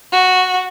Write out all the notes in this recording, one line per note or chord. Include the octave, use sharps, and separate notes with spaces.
F#4